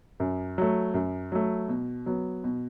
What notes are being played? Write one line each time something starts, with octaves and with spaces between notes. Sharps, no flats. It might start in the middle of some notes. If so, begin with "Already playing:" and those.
F#2
F#3 A3
F#2
F#3 A3
B2
F#3 B3
B2